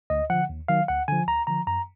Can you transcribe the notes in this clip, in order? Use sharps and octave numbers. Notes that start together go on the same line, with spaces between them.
D2 D#5
D3 F3 F#5
D#2
D#3 F#3 F5
D2 F#5
D3 F3 G#5
D2 A#5
D3 F3 A#5
F#2 A#5